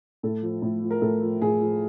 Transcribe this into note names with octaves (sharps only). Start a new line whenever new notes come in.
A2 A4
F3
A2
F3
A#4
A2 A4
F3
A2 G#4
F3